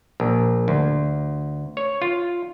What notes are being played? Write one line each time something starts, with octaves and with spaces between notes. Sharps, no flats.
A#1
D2
C#5
F4